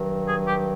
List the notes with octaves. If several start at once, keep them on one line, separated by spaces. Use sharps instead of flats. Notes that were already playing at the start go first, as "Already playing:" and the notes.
Already playing: G2 D#3 F#3
G#4
G4